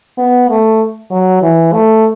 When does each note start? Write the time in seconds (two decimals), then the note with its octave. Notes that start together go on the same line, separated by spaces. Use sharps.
0.17 B3
0.48 A3
1.11 F#3
1.42 E3
1.73 A3